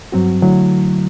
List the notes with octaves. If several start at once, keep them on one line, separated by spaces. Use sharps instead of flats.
G2 F#3 C4 F#4
D3 F#3 A3 E4